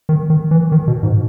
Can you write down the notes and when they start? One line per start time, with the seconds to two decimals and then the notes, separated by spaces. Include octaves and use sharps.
0.09 D#3
0.30 D#3
0.51 E3
0.72 D#3
0.88 B2
1.03 G#2